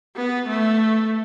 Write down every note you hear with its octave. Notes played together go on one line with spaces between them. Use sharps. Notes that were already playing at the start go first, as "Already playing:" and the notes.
B3
A3